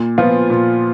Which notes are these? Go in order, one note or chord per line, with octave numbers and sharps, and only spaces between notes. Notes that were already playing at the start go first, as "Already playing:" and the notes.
Already playing: A#2
F3 B3 F4
A#2